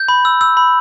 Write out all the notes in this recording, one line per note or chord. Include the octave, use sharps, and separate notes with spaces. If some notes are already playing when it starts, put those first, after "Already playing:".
Already playing: G6
B5
E6
E6
B5